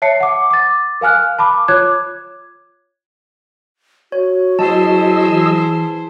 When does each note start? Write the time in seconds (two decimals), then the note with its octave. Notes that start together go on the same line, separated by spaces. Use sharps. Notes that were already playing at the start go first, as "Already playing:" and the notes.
0.02 C#5 E5 A5 C7 C#7
0.20 F#5 D6
0.50 D6 A6
1.01 A#4 F5 G#5 F6 F#6
1.39 A5 B5 D6
1.68 F4 C#5 D6 F#6 G#6
4.12 F#4 C#5
4.59 F#3 E4 G#4 C5 D#5 A5 E6
5.29 E3